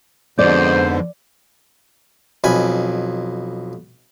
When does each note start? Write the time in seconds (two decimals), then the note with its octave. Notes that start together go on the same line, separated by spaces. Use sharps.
0.39 F2 G#2 B2 D3 C5 D5
2.44 B1 F2 G#5 B5